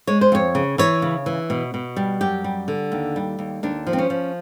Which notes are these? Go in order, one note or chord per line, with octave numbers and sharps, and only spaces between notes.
G#3 C#5
C5
F2 C#5
C#3
E3 C#5
C#3
E3
B2
B2
G3
F#2 G4
G3
D3
D#2
G3
D#2
D#2 D4
F3
C4
C#4
F3